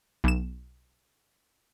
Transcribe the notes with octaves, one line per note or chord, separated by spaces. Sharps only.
B1 E7